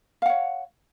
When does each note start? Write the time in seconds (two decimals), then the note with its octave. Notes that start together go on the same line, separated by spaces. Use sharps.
0.22 F5
0.26 F#5
0.29 C#5